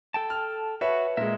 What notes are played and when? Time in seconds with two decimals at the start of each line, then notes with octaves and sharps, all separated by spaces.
0.14 A4 G5 A5
0.30 F6
0.81 F#4 B4 C#5 E5
1.17 A#2 G#3 A#4 E5